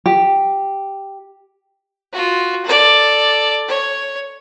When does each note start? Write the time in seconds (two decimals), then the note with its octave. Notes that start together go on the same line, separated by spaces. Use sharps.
0.06 G4
2.13 F4 F#4
2.65 A4 D5
3.68 C#5